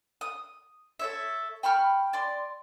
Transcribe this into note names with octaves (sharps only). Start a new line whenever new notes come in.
D#6
A4 C#5 E5
G5 B5 C#6 F6
D5 C6